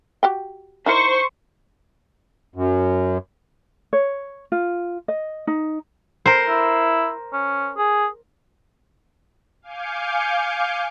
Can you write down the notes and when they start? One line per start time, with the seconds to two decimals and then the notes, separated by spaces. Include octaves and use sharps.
0.23 F#4 G4 G5
0.86 D#4 E4 A#4 C5 C#6
2.56 F#2
3.93 C#5
4.52 F4
5.08 D#5
5.47 D#4
6.26 A#4 C5
6.49 E4
7.33 C#4
7.77 G#4
9.62 F5 G#5 D6 G6 C#7